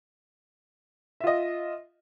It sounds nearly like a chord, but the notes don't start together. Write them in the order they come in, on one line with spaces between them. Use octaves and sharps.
E5 F4 D#5